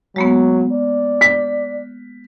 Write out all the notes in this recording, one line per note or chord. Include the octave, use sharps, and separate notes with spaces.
F#3 G#3 A#3 B3
D5
B6